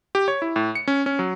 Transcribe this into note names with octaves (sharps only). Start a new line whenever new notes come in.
G4
C#5
E4
A2
C#7
C#4
C#4
F#3